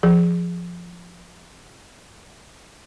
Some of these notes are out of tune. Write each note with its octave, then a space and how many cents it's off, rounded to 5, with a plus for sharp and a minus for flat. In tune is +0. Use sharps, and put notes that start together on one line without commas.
F3 +0 G#4 +0